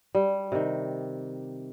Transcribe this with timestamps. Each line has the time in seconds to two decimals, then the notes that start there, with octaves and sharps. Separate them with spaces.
0.15 G3
0.52 C3 D#3